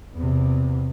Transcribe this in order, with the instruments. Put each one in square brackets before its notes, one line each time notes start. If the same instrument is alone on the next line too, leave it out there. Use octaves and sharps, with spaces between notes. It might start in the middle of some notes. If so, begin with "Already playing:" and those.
[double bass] E2 C3